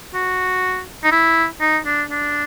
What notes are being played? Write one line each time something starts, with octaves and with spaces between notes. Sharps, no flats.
F#4
D#4
E4
D#4
D4
D4